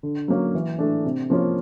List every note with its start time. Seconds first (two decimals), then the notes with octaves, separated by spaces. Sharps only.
0.03 D3
0.28 F#3 A#3 C#4
0.55 E3
0.79 A3 D4
1.05 C3
1.30 F3 A#3 C#4 F4